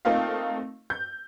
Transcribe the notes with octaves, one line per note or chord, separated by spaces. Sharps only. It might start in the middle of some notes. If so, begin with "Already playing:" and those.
A3 A#3 C4 D#4 F4 F5
G6